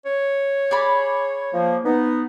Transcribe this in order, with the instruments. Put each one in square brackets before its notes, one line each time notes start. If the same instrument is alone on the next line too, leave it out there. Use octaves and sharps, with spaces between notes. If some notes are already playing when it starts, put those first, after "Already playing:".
[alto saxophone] C#5
[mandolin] G#4 D5 B5
[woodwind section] F3 A#3
B3 D#4